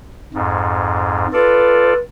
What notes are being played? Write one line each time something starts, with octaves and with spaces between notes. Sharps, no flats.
F2 G#2
F4 A4 B4 D5